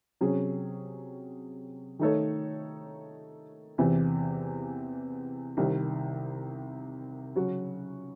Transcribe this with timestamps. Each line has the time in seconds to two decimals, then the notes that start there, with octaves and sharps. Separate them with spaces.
0.21 C3 F#3 C#4 G#4
1.99 D#3 A3 D#4 A4 C#5
3.78 E2 C3 E3
5.57 C2 C3 D#3
7.35 C#3 F#3 C#4 F#4